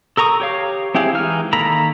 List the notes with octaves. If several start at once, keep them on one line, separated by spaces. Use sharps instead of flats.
A4 A#4 A#5 C#6 D#6
G4 C#5 F5
C4 E4 G4 G#4 F5
E3 G#3 D#4 F6
D#3 A#3 A4 A#5 B5